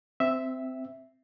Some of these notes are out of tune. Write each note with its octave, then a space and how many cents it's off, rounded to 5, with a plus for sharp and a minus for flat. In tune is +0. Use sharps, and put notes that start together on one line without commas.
C4 -15 E5 +0